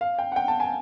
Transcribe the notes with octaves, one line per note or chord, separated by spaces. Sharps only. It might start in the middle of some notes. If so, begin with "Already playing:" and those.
F5
G5
F#5
G5
A5
G#5